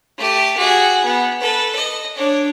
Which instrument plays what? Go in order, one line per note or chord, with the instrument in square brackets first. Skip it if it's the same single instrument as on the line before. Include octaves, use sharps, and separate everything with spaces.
[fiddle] A3 G4
F#4 G#4
B3
A4 B4
D#5
D4 C#5